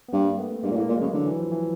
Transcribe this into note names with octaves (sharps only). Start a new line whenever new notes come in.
B3
G2 A#3 C4
A3 B3
G2 G#3 A#3
A#2
A2
G#3 A#3
A#2
C#3 F#3 G#3
D3 E3 F#3
E3
F3
E3